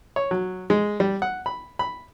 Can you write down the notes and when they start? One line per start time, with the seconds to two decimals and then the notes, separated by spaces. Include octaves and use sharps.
0.16 C#5
0.31 F#3
0.70 G#3
1.00 G3
1.22 F#5
1.46 B5
1.79 B5